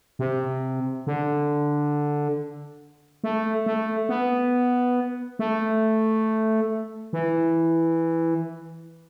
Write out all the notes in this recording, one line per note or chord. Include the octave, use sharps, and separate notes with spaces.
C3
D3
A3
A3
B3
A3
E3